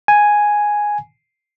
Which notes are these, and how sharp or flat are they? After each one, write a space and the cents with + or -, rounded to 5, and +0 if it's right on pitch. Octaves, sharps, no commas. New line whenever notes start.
G#5 +0